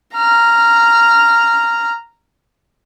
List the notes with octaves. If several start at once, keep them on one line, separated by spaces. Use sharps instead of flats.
A#5 F6